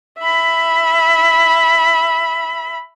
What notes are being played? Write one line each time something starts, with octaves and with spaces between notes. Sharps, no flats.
E5 B5